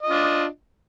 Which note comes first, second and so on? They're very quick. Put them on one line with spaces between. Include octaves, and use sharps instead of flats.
D#5 F4 D4